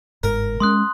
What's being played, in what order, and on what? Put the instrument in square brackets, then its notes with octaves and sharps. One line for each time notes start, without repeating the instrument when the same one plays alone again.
[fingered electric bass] G1 G#2 [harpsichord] A#4
[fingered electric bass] G#3 C4 C#4 [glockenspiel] C6 D#6 F#6